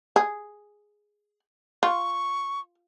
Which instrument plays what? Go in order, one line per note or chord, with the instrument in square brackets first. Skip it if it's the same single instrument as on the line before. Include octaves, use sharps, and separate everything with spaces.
[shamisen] G#4
[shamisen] F4 [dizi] C#6